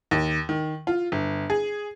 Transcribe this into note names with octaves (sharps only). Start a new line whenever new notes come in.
D#2
D#3
F4
G1
G#4